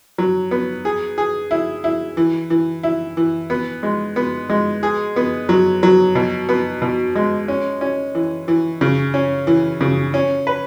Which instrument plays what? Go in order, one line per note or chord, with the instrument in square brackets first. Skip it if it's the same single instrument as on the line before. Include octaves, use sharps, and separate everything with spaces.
[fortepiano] F#3
B3
G#4
G#4
E4
E4
E3
E3
E4
E3
B3
G#3
B3
G#3
G#4
B3
F#3
F#3
B2
B3
B2
G#3
C#4
C#4
E3
E3
C#3
C#4
E3
C#3
C#4
B4